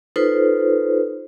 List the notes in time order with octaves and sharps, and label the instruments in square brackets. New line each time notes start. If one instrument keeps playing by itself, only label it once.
[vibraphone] D#4 F4 A4 B4 C5